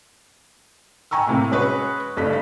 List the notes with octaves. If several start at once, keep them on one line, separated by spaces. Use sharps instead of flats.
G5 G#5 A#5 C#6 E6
A2 C3 A#3
G#3 C#4 F#4 G#4 B4 C#5
F#1 G2 A3 B6